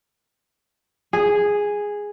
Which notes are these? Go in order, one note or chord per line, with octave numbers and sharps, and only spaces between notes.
G#4